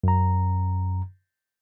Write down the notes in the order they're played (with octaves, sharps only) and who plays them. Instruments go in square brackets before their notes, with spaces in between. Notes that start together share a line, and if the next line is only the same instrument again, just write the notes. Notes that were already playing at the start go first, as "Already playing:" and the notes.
[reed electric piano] F#2 A#5